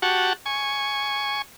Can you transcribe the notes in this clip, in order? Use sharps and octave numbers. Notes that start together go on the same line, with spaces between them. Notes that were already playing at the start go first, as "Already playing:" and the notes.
F#4 G4 F#5 A5 C#6
G#5 C#6